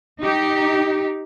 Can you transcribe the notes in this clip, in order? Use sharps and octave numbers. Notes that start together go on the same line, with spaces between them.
D#4 G4